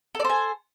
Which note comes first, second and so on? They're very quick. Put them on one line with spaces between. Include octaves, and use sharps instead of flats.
A4 D5 C5 G#5